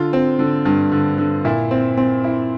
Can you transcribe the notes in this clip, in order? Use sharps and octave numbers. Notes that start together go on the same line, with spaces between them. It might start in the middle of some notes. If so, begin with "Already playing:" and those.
Already playing: D3 F4
C4
D3
G2
D3
D3
A#2 E4
C4
C4
E4